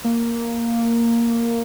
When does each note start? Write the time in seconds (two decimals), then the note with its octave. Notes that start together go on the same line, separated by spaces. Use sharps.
0.04 A#3